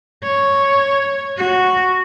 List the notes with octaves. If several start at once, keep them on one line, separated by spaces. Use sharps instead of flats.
C#5
F#4